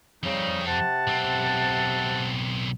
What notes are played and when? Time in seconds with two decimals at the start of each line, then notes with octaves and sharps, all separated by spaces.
0.23 F2 C#3 G3 C4 D#4
0.66 C3 F#5 A5
1.07 B1 C4